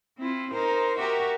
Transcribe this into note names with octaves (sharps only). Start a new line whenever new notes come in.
C4 E4 F4
D#4 A#4 C5
F#4 G4 A#4 E5 C#6